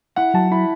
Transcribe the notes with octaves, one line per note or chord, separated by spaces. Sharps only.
E4 F#5
F#3 A5
E4 B5